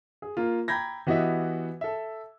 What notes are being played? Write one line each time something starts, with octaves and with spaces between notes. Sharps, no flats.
G#4
A#3 F4
G5 A#5 B5 G6 G#6 A#6
E3 B3 F#4 G4 D#5 E5
A4 E5